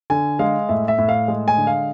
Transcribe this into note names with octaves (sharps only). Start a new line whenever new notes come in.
D3 G#5
G#3 F5
A2 E5
E5
A2
F5
G#3
G#5
D3
F5